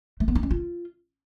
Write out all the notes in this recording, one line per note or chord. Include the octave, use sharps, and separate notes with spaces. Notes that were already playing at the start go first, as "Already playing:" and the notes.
A3
B3
D#4
C#4
F4